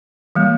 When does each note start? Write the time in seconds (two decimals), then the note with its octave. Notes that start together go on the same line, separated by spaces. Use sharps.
0.35 E3 G3 A#3